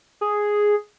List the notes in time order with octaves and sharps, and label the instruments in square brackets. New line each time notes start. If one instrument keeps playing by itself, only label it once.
[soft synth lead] G#4